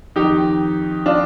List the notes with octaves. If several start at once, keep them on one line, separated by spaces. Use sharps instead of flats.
F2 D#3 D#4 G4
D4 F4